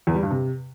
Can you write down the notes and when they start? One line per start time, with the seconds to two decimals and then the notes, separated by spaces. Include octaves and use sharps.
0.07 E2
0.15 G3
0.23 G2
0.31 C3